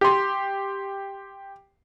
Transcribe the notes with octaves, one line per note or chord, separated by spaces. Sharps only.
G4 C6